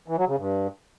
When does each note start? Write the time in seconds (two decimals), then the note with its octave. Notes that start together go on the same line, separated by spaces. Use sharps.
0.08 E3
0.18 F#3
0.28 C#3
0.37 G2